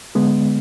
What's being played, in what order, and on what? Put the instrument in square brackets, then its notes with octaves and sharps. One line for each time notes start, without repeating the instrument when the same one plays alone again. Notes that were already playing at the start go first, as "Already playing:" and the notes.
[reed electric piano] D3 G#3 B3